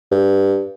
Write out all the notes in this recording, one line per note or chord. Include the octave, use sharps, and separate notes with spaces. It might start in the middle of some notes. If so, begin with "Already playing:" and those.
G2